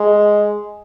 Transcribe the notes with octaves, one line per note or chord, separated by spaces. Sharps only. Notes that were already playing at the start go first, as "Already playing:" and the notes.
Already playing: G#3